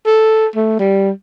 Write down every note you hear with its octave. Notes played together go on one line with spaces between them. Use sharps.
A4
A3
G3